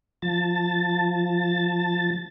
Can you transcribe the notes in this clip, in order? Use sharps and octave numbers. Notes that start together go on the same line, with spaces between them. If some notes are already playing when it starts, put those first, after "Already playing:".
F3 A5